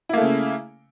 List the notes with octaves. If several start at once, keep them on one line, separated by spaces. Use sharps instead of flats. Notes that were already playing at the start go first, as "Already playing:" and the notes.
C#3 A3 A#3 E4